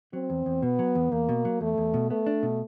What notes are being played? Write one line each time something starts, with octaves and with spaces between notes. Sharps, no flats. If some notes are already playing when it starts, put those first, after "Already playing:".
F#3 C4
E2
E2
B2 B3
F#3
E2
E2 A#3
B2
F#3
E2 A3
E2
B2
A3 B3
D4
B2